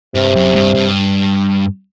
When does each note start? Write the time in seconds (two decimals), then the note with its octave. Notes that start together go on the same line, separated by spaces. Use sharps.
0.15 G2 C3
0.36 F#2
0.55 G2
0.75 G2